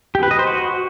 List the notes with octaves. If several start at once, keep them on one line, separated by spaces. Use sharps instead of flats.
G4
B4
D#5
C5
F#4